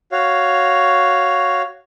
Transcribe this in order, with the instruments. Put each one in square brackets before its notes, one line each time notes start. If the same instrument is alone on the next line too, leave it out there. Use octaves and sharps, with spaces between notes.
[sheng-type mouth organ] F#4 C#5 F5